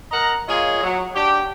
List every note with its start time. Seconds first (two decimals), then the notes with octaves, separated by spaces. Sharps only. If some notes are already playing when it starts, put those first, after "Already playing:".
0.11 A#4 D#5 F#5 A#5
0.48 A#3 F4 G#4 C#5 D#5
0.83 F#3
1.15 D4 F#4 G4